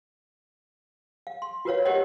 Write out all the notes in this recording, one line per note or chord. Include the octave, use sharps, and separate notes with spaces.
F5
C6
F4 F#4 A#4 B4 C#5 F5
G4 A#4 C5 C#5 D#5 F#5